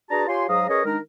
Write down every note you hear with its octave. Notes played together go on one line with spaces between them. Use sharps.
D4 F#4 G#4 B4 A5 A#5
F4 G4 C#5 G#5 C6
G#2 F#3 G#4 F5 A#5 D#6
C#4 G#4 A#4 B4 C#5 D#5
D#3 G#3 D4 D#4 A#4